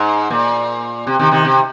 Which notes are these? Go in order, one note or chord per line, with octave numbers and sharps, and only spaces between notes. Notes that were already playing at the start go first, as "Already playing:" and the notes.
Already playing: G#2
A#2
C3
C3 D#3
C3 D#3
C3